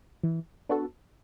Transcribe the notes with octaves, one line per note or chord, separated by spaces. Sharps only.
E3
B3 D4 F#4 A4